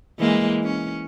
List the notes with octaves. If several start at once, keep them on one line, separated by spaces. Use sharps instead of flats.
E3 G#3 A#3
C#4